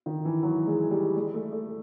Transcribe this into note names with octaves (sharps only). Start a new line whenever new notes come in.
D#3
E3
F#3
G#3
G3
G#3
A3
A3